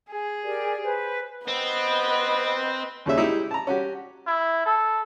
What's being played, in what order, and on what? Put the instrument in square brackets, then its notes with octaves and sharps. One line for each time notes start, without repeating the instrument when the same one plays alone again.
[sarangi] G#4
[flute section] G4 A#4 D5
B4 C5
[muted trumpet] B3 [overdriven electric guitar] C4 [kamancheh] B4 D#5
[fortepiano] D#2 C#3 G3 C#4 E5
G#3 D#4 E4 G4 E5
A5 A#5
C#4 F#4 G4
[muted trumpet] E4
A4